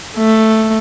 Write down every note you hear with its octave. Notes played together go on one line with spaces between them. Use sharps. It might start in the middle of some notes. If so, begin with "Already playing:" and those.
A3